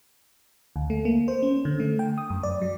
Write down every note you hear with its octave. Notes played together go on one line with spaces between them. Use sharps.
D2
A3
A#3
C5
C#4
D3
A3
G5
D#6
F#2
D5
F#3